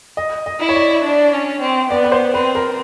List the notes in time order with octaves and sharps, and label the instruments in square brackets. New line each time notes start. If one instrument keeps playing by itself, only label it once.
[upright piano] D#5
D#5
[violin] E4
[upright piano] C#5
D5
[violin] D4
C#4
C4
[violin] B3 [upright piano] D5
[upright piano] B4
C5
[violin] C4 [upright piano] B4
[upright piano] A#4